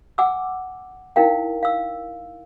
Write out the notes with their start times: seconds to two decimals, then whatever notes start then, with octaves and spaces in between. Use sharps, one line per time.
0.18 F#5 G#5 D6 E6
1.16 D#4 E4 A#4 F5 G5
1.63 F5 E6